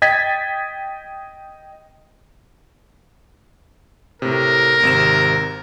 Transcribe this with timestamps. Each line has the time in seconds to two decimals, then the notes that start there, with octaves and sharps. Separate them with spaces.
0.02 D#5 G5 G#6 A6 B6
4.22 A2 C3 A#4
4.83 G#1 C3 E7